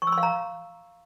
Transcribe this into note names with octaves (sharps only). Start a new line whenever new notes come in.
C#6
E6
C6
F5
A#5